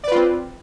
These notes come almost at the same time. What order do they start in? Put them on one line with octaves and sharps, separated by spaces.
D5 B4 F4 C4